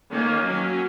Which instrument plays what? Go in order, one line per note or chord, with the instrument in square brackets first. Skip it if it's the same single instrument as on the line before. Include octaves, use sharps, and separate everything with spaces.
[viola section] D#3 A#3 C#4
F#3 C#4